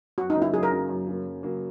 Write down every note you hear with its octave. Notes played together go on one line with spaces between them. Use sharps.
F#2 F#4
D#4
C#3 F#3 A#3
E4
F#2 G#4
A#4
C#3 F#3 A#3
F#2
C#3 F#3 A#3
F#2
C#3 F#3 A#3